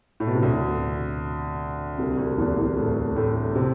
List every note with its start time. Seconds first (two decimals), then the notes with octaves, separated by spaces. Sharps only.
0.20 A2
0.27 B2
0.34 C3
0.42 D2 D3
1.98 C2 C3
2.18 D2 D3
2.37 E2 E3
2.57 E2 E3
2.77 A2 A3
3.16 A2 A3
3.55 C3 C4